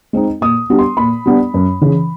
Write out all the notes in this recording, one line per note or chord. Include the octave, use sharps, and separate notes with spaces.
G#3 C4 D#4
A#2 D#6
G3 B3 D4
C6
A#2 B5
G3 B3 D4
F#2
C#3 E3